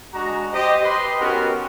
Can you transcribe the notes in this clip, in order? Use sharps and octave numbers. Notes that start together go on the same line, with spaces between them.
G#3 D4 F#4 A#5
G4 C5 D#5
G4 B4 D#5 C6
B3 C#4 D#4 F#4 G4 A#4